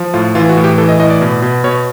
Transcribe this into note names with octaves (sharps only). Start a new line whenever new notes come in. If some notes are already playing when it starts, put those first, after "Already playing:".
Already playing: F3
A2 F4
E3 F4
F#4
A2
G4
E3 A4
D#5
A2 D#5
D5
B2
B2
B2 C#5